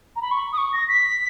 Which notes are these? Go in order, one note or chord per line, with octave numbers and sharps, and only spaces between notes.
A#5
B5
C#6
D#6
C#6
A#6
B6